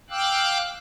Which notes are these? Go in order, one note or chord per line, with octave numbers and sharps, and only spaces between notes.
F5 G5 D6 E6 F#6